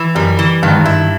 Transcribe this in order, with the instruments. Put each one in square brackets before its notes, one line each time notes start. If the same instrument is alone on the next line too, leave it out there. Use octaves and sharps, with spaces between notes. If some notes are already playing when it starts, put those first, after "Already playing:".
Already playing: [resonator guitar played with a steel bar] E3
[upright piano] F#2 [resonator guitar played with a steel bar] G3
[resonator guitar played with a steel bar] E3
[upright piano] G2 [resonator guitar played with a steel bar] D#3
[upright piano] G#2
G2
[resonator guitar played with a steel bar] E4